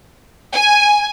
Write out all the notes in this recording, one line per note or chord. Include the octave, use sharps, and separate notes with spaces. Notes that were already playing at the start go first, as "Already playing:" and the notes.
G#5